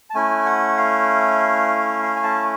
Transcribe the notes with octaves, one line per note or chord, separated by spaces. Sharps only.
A5
A3 C#4 E4 G#5
F#5
F5
F5
G#5
A5